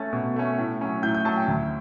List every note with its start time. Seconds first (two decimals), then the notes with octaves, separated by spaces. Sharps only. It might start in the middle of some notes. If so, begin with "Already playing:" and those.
Already playing: A3 C#4 A6
0.13 B2
0.36 A3 C#4
0.58 A2
0.81 F#3 C#4
1.02 A2 G6
1.15 G6
1.25 F#3 C#4 A5
1.37 G5
1.48 D2